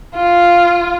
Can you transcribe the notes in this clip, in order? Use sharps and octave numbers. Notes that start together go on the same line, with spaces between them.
F4